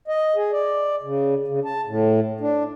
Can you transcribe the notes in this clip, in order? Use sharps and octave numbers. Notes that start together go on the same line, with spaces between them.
D#5
G#4
D5
C#3
C#3
A5
A2
D4